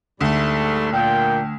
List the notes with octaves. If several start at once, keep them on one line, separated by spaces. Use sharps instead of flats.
D2 G#2 G3 A3
A#2 G5